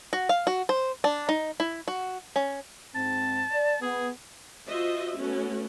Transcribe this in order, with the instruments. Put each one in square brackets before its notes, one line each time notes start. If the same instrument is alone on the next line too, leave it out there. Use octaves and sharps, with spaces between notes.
[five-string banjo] F#4
F5
F#4
C5
D4
D#4
E4
F#4
C#4
[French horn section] G#2 C4 [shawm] A5
[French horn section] D5
[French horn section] B3 [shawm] G#4
[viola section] F4 F#4 C5 D#5 E5
A3 B3 C#4 F#4